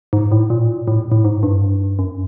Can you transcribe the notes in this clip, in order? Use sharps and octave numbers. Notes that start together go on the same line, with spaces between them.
G#2
A2
A#2
A2
A2
G#2
G2
F#2